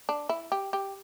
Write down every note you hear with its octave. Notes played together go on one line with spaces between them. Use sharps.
D4
E4
G4
G4